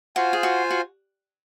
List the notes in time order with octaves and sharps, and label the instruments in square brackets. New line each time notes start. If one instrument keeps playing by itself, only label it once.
[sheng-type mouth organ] F4 C5 F5 G#5 [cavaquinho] F#4
[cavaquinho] G#4
F#4
F#4